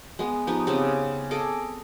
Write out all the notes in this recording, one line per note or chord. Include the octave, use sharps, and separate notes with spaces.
G#3 B3
F3 B3 D#4 G4
C#3 B3 C4 G4
G#4 A4 D#5 D6